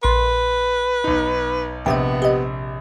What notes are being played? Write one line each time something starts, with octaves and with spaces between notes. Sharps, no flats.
A#1 B4 C6
B1 D#4
A#1 C3 B3 D#5 E5 G5
G4 D#5